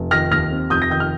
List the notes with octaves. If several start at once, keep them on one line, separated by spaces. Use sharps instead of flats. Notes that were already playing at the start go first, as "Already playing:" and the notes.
Already playing: F1
D#3 F6 A#6
D#2 F6 A#6
C4
F1 D#6 G6
A#6
D#3 G6
F6